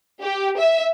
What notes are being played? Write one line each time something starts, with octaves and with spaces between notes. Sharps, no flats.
G4
E5